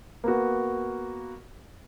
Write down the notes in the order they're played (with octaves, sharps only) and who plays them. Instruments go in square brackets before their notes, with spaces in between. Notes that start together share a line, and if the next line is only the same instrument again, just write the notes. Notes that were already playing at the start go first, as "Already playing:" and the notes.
[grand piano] A#3 B3 F#4